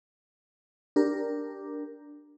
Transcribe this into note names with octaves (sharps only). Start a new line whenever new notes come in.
D4 G4 A#4